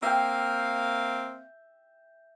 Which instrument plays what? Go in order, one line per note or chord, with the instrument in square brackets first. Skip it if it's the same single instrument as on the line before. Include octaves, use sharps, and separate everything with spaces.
[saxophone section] A#3 C4 F5 [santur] E5 G5